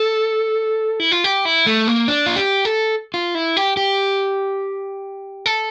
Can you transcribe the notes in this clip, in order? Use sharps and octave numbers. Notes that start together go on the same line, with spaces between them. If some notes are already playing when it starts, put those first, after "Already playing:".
Already playing: A4
E4
F4
G4
E4
A3
A#3
D4
F4
G4
A4
F4
E4
G4
G4
A4